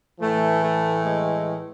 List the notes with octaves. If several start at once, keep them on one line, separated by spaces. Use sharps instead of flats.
A2 E3 A3
A3
G#3